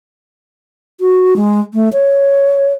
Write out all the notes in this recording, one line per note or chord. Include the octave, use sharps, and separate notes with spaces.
F#4
G#3
A3
C#5